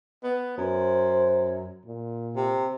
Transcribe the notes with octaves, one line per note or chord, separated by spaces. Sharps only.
B3
F#2 C5
A#2
C3